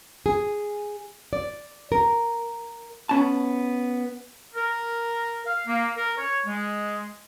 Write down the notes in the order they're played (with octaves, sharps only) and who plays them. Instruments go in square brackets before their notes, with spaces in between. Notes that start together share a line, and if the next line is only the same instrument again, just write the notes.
[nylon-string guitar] G#4
D5
A#4
[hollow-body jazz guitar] B3 C#4 A5
[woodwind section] A#4
F5
A#3
A#4
C#5
G#3